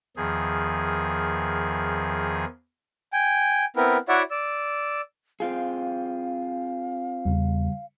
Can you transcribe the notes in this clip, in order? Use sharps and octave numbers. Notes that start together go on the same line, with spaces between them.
E2 D#3 F3 G#4
G5 G#5
B3 C4 E4 A#4 B4
E4 F#4 C#5 D5 E5 F#5
D5 E6
C4 F4 G#4 F5
E2 C#3 G3